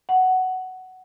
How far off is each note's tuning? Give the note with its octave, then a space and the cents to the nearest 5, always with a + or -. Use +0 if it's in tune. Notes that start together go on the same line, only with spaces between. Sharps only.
F#5 +10